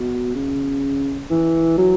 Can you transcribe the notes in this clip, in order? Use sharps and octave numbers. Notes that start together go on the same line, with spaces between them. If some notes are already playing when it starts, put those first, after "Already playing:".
Already playing: B2
C#3
E3
F#3